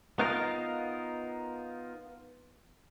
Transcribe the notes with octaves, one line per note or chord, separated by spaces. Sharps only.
B3 D#4 F4 A#4